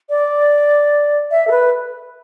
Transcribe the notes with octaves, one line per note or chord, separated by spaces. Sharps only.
D5
E5
A4
B4